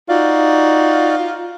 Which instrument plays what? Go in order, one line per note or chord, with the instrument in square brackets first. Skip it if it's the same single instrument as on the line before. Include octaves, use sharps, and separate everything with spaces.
[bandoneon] D#4 F#4 D5 [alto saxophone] F4